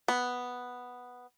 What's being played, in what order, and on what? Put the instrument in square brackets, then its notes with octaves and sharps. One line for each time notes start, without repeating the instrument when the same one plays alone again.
[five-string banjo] B3